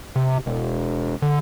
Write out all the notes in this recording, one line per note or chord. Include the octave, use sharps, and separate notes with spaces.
C3
E1
D3